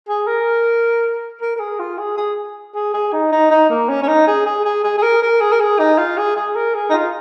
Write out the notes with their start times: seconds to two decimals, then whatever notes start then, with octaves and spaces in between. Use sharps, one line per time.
0.08 G#4
0.27 A#4
1.42 A#4
1.56 A#4
1.60 G#4
1.79 F4
1.98 G#4
2.17 G#4
2.75 G#4
2.94 G#4
3.13 D#4
3.32 D#4
3.51 D#4
3.70 A#3
3.89 C#4
4.03 C#4
4.08 D#4
4.27 G#4
4.46 G#4
4.65 G#4
4.84 G#4
4.98 G#4
5.03 A#4
5.22 A#4
5.41 G#4
5.52 A#4
5.60 G#4
5.79 D#4
5.98 F4
6.18 G#4
6.36 G#4
6.56 A#4
6.75 G#4
6.90 D#4
6.93 F4